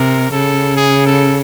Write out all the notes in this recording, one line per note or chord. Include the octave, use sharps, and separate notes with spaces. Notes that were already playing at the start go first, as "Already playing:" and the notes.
Already playing: C3 A#4
C#3 A4
G#4
A4